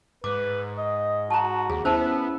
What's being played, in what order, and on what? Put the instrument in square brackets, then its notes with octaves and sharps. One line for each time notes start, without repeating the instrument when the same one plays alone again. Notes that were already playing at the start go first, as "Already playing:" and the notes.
[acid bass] G#2 [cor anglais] B4 [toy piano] D6
[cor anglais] D#5
[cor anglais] F#4 [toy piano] A5 A#5
[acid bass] D#2 [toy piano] G#4
[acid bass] B3 [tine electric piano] C#4 E4 [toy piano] C5 A5 [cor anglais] E5